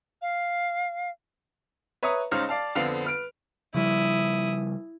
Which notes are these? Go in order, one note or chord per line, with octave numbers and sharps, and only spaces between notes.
F5
B4 C#5 E5 A#5 D#6
C#2 D#4 C5 C#5 D#5 F6
D5 F5 A5
F2 D3 B3 C4 F5 F7
B4 F6 D7
C#3 F3 G3 E4 D#6